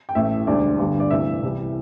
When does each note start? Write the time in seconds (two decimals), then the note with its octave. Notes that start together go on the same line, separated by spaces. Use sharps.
0.09 G5
0.15 A1 A2 A3 E5
0.47 E1 D2 D3 G3 D5
0.79 G1 G2 D3 G3
1.00 D5
1.11 D2 C3 E3 E5
1.43 C2 C3 E3 G3